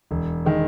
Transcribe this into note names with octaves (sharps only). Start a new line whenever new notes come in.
E1
D#3 G#3